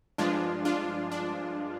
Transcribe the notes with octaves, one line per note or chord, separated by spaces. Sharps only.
G2 F3 G#3 D4 F4
D4 F4
D4